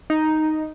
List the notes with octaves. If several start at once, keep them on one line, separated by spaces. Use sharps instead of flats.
D#4